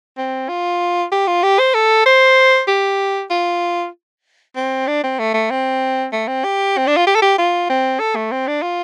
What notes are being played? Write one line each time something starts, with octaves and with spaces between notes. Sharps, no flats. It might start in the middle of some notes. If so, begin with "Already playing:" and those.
C4
F4
G4
F4
G4
C5
A4
C5
G4
F4
C4
D4
C4
A3
A3
C4
A3
C4
G4
C4
D4
F4
G4
A4
G4
F4
C4
A4
A3
C4
D4
F4